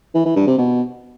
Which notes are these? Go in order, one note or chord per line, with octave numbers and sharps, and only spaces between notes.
E3
E3
G2
C3
B2